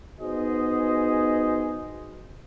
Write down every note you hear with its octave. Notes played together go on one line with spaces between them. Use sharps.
B3 D#4 F#4 G#4 C5 D#5